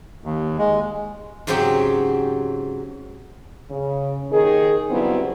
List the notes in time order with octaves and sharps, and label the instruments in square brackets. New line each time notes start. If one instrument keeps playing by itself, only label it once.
[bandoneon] D#2
G#3
[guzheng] G#2 C#3 F#3 C4 G4 G5
[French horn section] C#3
D#2 D#3 D#4 G#4
G2 C#3 F#3 B3 C4 E4